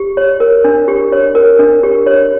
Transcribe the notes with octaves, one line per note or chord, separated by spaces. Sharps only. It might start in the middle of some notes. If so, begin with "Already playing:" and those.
Already playing: G4
C#5
A#4
D4
G4
C#5
A#4
D4
G4
C#5